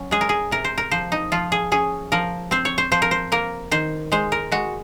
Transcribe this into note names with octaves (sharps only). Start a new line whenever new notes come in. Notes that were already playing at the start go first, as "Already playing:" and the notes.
Already playing: F#3 C#4
G#3 G#4
A#4
G#4
C3 A#4
C5
A#4
F3 C5
D#4
F3 F4
G#4
C#4 G#4
F3 A#4
C4 C5
C#5
C5
F3 C5
A#4
C5
A#3 A#4
D#3 C5
G#3 C5
A#4
G#3 F#4